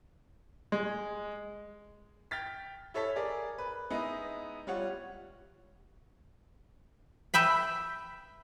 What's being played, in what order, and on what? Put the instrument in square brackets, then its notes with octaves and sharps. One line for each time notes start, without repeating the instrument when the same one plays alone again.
[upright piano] G#3
G5 F6 A6 B6
E4 A4 C#5 A5 B6
G#4 A#4 D5
B4
G#3 B3 D#4 E4
G3 F4 C#5 F#5
[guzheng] B4 E5 G5 B5